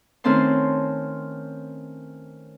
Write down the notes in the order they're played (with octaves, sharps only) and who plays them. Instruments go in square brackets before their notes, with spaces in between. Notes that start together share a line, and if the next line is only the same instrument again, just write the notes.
[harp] D#3 A3 C4 C#4 A5 C6